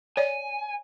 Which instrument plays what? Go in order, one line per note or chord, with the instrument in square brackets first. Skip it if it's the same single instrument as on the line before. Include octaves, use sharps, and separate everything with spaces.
[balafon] C#5 D5 [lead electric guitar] G#5